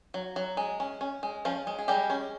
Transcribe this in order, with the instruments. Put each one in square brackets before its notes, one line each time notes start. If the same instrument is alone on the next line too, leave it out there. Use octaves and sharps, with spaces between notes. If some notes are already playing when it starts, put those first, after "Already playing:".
[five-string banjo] F#3
F#3
G#3
C#4
C#4
G#3
F3 C#4 F4
G#3
G#4
G3 G#3 G4
C#4